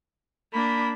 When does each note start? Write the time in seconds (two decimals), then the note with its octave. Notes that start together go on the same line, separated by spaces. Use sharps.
0.53 A#3 D4 B5